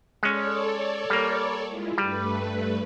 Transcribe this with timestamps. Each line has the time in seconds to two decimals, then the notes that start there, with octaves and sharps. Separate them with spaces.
0.23 G#3 C#4 A4 C#5 D5
1.10 G3 A#3
1.66 G#3 E4 F4
1.98 G2 G3 A3 B4